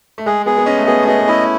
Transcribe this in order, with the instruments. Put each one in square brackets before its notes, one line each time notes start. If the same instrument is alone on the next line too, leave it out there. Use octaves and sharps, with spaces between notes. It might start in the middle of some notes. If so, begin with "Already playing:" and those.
[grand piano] A3
[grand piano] G#3 [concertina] G#4
[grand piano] B3 [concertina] G#4
[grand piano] B3
[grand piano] C#4 [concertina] D#5
[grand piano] A3
[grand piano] B3 [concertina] G#4
[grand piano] A3
[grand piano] B3 [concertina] D#5
[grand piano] B3
[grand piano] C#4 [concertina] E4